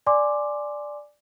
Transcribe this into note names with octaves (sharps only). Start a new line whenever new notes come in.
D5 G#5 C6 D6